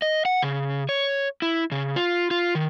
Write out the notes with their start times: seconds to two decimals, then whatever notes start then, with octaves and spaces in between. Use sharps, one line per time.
0.02 D#5
0.25 F#5
0.42 C#3
0.89 C#5
1.42 E4
1.72 C#3
1.96 F4
2.31 F4
2.55 D#3